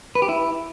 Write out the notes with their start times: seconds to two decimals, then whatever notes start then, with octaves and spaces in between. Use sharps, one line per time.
0.15 B4
0.22 G4
0.29 E4